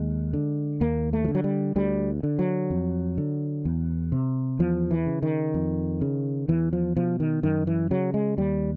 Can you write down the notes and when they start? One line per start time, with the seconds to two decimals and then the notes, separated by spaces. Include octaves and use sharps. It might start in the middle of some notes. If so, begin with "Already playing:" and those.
Already playing: D#2 G#3
0.33 D3
0.81 D#2 A#3
1.13 A3
1.24 F3
1.28 D3
1.35 F#3
1.44 G3
1.76 D2 G3
2.23 D3
2.39 F#3
2.70 F2
3.18 D3
3.65 E2
4.12 C3
4.59 E2 F3
4.91 E3
5.06 C#3
5.23 D#3
5.54 F2
6.01 C#3
6.48 E2 E3
6.73 F3
6.96 B2 F3
7.20 D#3
7.43 F#2 D#3
7.67 E3
7.91 C#3 F#3
8.14 G#3
8.38 D#2 G3